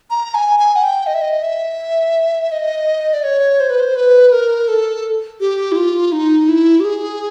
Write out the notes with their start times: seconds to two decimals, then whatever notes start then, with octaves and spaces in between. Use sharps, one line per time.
0.11 A#5
0.35 G#5
0.59 G#5
0.76 F#5
0.83 G5
1.06 D#5
1.14 E5
1.21 D#5
1.43 E5
2.52 D#5
3.13 D5
3.24 C#5
3.60 C5
3.70 B4
3.80 C5
3.96 B4
4.32 A#4
4.68 A4
5.40 G4
5.72 E4
5.76 F4
6.12 D#4
6.49 E4
6.80 G4
6.85 G#4